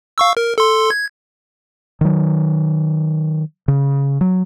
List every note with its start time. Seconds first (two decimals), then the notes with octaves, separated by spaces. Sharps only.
0.18 F5 C#6 E6
0.37 A#4
0.58 A4 C6
0.90 G#6
2.01 D#3 F#3
3.68 C#3
4.21 F#3